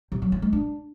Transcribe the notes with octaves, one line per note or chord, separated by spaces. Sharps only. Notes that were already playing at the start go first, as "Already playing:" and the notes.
C3
F#3
C#4
G#3
D4